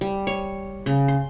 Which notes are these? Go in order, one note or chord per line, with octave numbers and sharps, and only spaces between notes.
G3
C#5
C#3
C6